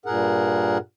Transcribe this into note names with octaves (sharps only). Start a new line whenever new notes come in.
G2 A#2 G#4 A#4 F#5